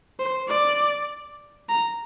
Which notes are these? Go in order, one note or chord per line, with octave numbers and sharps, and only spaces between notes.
C5
D5
A#5